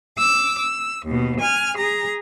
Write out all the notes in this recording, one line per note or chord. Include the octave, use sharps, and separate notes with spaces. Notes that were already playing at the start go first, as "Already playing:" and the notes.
D6 E6
E6
D#2 B2
G#5 F6
G#4 A#5